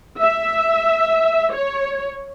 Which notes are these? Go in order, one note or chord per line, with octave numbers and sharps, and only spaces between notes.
E5
C#5